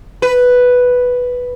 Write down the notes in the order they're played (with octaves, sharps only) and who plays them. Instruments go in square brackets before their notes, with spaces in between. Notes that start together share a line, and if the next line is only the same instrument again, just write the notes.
[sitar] B4